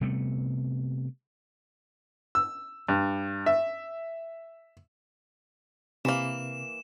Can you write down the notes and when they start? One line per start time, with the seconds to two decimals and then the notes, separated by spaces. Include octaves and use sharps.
0.01 C3 G3 A3 B3
2.35 E6
2.89 G2
3.46 E5
6.05 C3 E3 A#3 E7